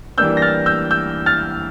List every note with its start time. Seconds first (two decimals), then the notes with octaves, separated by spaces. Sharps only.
0.18 E3 G3 A#3 D4 E6 G6
0.37 A#6
0.42 F6 A6
0.66 E6 G6
0.91 E6 G6
1.26 F6 A6